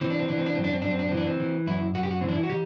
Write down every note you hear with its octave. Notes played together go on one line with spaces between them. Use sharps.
E3 C4
D4
C4
E3 D4
C4
D4
F#2 C4
D4
C4
F#2 D4
C4
D4
E3 C4
D4
C4
E3
F#2 E4
F#2 F#4
G4
F#4
E3 C4
D4
E4
F#4
E3 G4